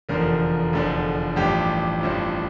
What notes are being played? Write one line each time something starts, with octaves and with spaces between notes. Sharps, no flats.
F1 E2 D3 F3 A#4
F1 E2 D3 F3
A1 G2 F3 G4
A1 G2 F3